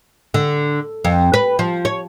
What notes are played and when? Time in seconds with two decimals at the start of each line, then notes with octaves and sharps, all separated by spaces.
0.34 D3
1.04 F2
1.34 B4
1.59 F3
1.85 C#5